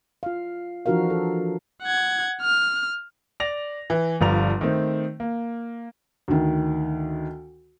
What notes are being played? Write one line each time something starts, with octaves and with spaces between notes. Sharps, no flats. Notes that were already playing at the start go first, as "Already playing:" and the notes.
F4 F5
E3 F3 D4 F#4 A#4 F5
A4
F#5 G#6
F6
D5 A#6 F7
E3
G1 G2 F3 A#5 F7
D#3 A3 C4
A#3
D2 D#3